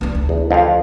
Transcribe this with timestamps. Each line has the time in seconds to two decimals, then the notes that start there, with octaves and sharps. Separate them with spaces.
0.01 B3 D4
0.15 D2
0.29 E2
0.51 F2 F5